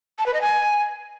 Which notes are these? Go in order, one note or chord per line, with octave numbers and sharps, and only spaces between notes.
A5
B4
D#5
G#5